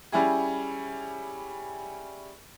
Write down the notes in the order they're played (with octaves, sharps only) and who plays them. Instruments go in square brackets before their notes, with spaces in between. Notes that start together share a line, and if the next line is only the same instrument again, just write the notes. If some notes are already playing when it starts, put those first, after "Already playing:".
[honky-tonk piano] G3 C#4 E4 G#4